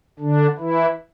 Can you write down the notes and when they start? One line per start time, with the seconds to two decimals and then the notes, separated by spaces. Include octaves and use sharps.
0.19 D3 D4
0.58 E3 E4